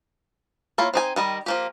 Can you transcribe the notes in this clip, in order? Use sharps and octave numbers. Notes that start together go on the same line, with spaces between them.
A#3 E4 F4 C#5
C4 D#4 G#5
D#3 G3 D#5
F3 A#3 G4